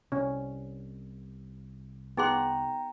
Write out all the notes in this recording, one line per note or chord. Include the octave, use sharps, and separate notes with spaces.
C2 C#4
B3 D#4 G#4 F#5 G5 A#5 C6